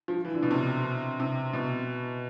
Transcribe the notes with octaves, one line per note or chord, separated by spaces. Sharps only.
F3
E3
D3
B2
C3
C3
B2